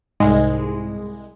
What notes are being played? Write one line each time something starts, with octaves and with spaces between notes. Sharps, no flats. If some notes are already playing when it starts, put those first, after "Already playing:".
C2 G#2 G#3